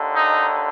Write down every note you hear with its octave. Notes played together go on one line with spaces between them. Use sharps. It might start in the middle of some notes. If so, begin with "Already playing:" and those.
Already playing: D#2 D3
D#4